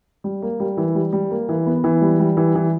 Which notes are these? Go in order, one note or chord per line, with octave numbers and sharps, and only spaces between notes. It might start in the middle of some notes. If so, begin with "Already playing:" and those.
G3
A#3
G3
E3
G3
G3
A#3
E3
B3
E3
G3
G3
E3
E3